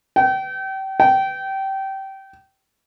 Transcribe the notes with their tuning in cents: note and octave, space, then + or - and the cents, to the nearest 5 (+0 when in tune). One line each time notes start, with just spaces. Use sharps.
G5 -30
G5 -20